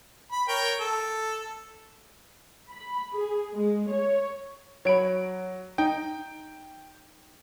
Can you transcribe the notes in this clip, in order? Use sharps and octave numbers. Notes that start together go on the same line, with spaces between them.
B5
A#4 C#5 G5
A4
B5
G#4
G#3
C#5
F#3 C#5 B5 D7
D#4 G5